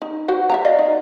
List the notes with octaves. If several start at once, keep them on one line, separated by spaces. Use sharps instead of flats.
D#4
F#4 C5 F#5
E5 F5 A#5
D5 D#5 F5
D#4